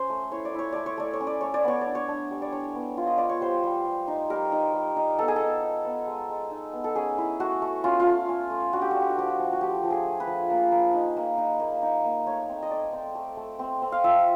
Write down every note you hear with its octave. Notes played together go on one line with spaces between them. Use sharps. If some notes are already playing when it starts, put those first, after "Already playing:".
Already playing: C#4 C5
A3
E4 C#5
D5
E4 C#5
A3 D5
C#5
A3 D5
C#5
C#4
D5
A3 C#5
D5
B3 C#5
D5
D4
C#5
D4
G3
D5
D4 C#5
B3
F4
D#5
F4 D5
C#5
G3 C5
G3
G3
D#4
G3 A#4
D#4
G3
D#4
B3 A4
G#4
D#4 A4
D#4
B3
G#3
G#3
D#4
B3
A4
C#4 G#4
E4
A3 F#4
A3
C#4 F4
F4
A3
C#4
A3
D4 F#4
G4
D4 F#4
G4
F#4
F3 G4
F#4
F3
F#4
F3 G4
F3
G#4
A3
B4
F3
A#3
A#3
D#4
A#3
D#4
A#3
D#4
A#3
A3 C#5
C4
D#5
A3 D5
C4
A3
A3
C4
C4
F5
F3 E5